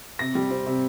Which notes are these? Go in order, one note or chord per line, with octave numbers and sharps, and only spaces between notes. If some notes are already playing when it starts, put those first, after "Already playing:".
C3 A#6
G3
C4
C3